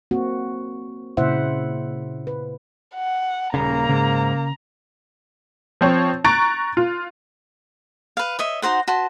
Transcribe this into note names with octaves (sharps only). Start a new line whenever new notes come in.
A#3 C4 F#4
A#2 C#3 E4 C5 E5 F#5
B4
F#5
D#1 G#1 C#3 A#3 A#5
G#2 C#3
F3 C4 C#5
A#5 C#6 F#6 A6 D7
F4
B4 F5
C#5 D#5 E5
D#4 F#4 C5 F#5
F#4 B4 A5 C6